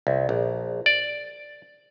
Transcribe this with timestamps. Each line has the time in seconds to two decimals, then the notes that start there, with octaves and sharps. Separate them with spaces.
0.07 C2
0.29 A#1
0.86 D5